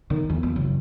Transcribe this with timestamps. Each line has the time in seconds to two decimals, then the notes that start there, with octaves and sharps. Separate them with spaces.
0.10 D#3
0.30 E2
0.43 A#3
0.56 F#1